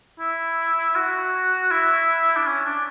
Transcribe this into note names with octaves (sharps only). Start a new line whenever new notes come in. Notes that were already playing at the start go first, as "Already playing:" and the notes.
E4
F#4
E4
D4
C#4
D4